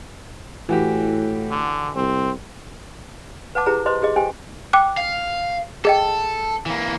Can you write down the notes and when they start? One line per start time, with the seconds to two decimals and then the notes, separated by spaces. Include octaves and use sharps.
0.69 A2 E3 F#4 G4
1.51 D3
1.96 C2 C4
3.55 B4 F#5 A5 D6
3.66 E4 G4 G#4 B4 A#5
3.86 B4 C5 D#5 C6
4.02 G4 G#4 D#5
4.16 G4 C5 G5 G#5
4.73 G5 D6 F#6
4.97 F5
5.85 G#4 A4 D#5 G5
6.66 E3 A#3